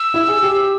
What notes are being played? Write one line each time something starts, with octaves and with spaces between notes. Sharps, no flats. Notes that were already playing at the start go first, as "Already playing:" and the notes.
Already playing: E6
E4
G#4
G4